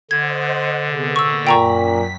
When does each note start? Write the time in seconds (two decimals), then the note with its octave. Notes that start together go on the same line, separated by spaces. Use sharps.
0.11 D3 C5 D#5 F#5 G#6
0.85 C3 B3 G#4
1.16 A#2 B5 C#6 E6 A#6
1.47 F#2 A#2 G5 A#5 C#6 B6